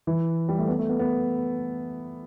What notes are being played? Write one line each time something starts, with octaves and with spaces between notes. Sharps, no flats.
E3
G3
A3
B3
A3
B3
B3